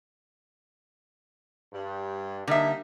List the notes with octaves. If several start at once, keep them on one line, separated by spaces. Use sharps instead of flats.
G2 G3
D3 G3 A#3 D#4 E5